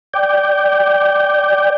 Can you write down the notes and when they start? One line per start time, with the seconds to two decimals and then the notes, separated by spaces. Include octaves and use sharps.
0.14 D5 G5